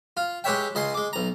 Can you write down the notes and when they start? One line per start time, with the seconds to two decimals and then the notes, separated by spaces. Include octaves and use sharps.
0.17 F4
0.44 G#3 G4 B4 C#5 E5 G5
0.75 C#2 D#5 G#5 C6
0.94 G#3 D6
1.13 B1 A#5